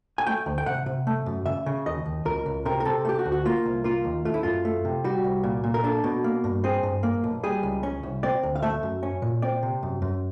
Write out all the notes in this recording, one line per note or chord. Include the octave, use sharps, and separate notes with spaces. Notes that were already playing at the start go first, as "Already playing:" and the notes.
G#5
A3 G5
D2
G5
C3 F#5
C3
A3
F#2
C#3 E5
C#3
D#2 D#5
D#2
C#2 A#4
C#2
C3 A#4
A#4
C3 A4
A3 G4
F#4
D2
F#4
A#3 F4
C2
A#3 F4
D#2
A3 F4
E4
F#2 F4
A3
C3
G3 F#4
C2
A#2
A#2
A#4
D4 A4
B2
A#3
G2
C4 G#4
G2
A#3
B1
G3 G#4
C#2
C#4
C2
C4 D5
D2
F5
A3 E5
F#2
C#4
A#2
C4 D5
C3
F#2
F#2